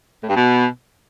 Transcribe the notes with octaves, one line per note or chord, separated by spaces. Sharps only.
A2
G2
B2